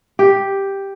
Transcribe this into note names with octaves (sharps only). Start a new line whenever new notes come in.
G4